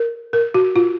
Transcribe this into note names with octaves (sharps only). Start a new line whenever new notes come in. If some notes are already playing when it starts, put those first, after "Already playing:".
Already playing: A#4
A#4
F#4
F4